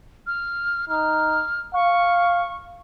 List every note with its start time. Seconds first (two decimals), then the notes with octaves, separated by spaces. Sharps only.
0.27 F6
0.89 D#4 F6
1.74 F5 C#6